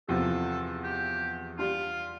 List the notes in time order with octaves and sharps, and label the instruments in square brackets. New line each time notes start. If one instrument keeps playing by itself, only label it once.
[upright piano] E2 C3 F3 C4 F4 [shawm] A4
[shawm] G4
[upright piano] G3 D4 G4 [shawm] F4